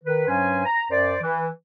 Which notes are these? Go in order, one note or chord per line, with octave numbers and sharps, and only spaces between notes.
D#3 B4
G2 F#3 C#4 C5 G#5
A#5
F#2 C5 D5
E3